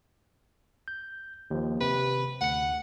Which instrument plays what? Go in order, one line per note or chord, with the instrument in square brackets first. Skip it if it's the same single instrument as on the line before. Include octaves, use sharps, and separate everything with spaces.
[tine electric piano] G6
D#2 F3
[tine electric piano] C3 [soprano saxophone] B4
[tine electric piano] D2 C#7 [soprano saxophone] F#5